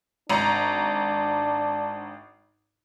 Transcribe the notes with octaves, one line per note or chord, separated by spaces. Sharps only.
G#1 D4 A#5